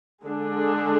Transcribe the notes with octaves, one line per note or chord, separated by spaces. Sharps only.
D3 G#3 D4 G#4